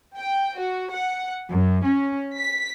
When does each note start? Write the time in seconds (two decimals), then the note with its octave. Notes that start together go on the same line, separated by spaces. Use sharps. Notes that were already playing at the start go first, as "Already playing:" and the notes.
0.16 G5
0.58 F#4
0.92 F#5
1.50 F#2
1.87 C#4
2.37 B6